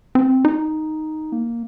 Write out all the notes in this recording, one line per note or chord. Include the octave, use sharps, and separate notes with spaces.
C4
D#4
A#3